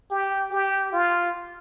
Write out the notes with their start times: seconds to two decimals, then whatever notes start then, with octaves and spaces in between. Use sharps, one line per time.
0.11 G4
0.52 G4
0.93 F4